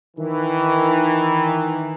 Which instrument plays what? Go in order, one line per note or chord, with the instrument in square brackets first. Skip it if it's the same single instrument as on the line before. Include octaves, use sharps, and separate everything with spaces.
[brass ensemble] D#3 E3